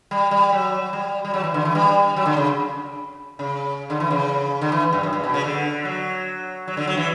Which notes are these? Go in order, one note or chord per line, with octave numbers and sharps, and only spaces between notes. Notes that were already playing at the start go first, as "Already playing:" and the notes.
G3
G3
F#3
G3
G3
F#3
E3
D3
E3
G3
F#3
D3
C#3
C#3
D3
E3
C#3
D3
E3
G2
F#2
G2
B2
C#3
D3
F#3
F#3
D3
F#3
E3